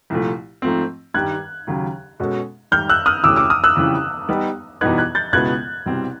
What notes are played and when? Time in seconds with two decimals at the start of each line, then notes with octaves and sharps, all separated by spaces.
0.10 C2 A#2 F3 A3
0.62 G#2 F3 A3 C4
1.14 G2 D#3 G3 F#6 G#6
1.67 D#2 C#3 F#3
2.20 B2 G#3 C#4 F#4 A4
2.71 G#2 D#3 G3 F6 G6
2.89 E6 F#6
3.06 D#6 F6
3.24 D2 C3 E3 A3 C#4 D6 E6
3.36 D6 E6
3.50 D#6 F6
3.64 E6 F#6
3.76 F2 C#3 E3 G3
4.29 G3 B3 D#4
4.81 E2 B2 G3 B3 D#4 F#6 G#6
4.98 F#6 G#6
5.15 G6 A6
5.33 C#2 B2 G#3 B3 E4 F#6 G#6
5.86 C2 B2 G3 C4